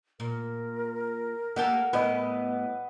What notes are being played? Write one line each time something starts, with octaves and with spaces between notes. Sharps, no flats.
A#2 A#4
A#3 G4 A4 F#5
A2 G3 B3 B4 D#5